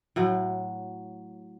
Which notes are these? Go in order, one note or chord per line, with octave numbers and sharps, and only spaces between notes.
A2 F#3